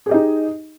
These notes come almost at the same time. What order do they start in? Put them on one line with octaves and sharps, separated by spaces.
G#4 G4 D#5 D#4